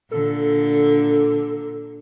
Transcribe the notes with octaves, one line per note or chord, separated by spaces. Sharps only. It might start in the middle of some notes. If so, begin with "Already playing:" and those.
A#2 D3 A4